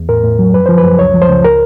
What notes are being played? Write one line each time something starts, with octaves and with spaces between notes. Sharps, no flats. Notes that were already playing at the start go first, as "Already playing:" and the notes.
Already playing: E2
A2 A#4
A2
F#3
F#2 B4
F3 C5
B4
F#2
C#2 C#5
F3
C5
C#2
A#4